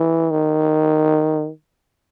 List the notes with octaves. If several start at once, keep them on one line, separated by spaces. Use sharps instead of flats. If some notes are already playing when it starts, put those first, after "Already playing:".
Already playing: E3
D#3